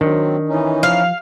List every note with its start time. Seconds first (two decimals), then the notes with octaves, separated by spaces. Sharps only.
0.01 D#3 F#3 C4 D4
0.49 E3 C#4 D#4
0.83 F3 F5